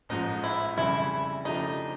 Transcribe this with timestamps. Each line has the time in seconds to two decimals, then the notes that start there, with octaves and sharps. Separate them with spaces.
0.09 A1 G#2 F3 G#3 D#4
0.44 E4
0.77 F2 C#3 E3 G3 E4
1.45 C#3 F3 A3 D4 D#4 G4